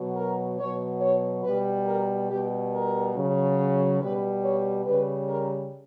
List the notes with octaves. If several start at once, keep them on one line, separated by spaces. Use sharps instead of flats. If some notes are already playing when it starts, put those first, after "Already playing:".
Already playing: B2 F#3
A#4
B2 F#3 C#5
C#5
B2 G3 B4
A#4
B2 G3 G4
A#4
C#3 F#3
B2 G3 B4
C#5
C#3 G3 B4
A#4